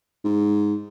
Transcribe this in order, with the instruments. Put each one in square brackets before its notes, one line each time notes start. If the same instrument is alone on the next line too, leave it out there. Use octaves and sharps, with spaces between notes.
[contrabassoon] G#2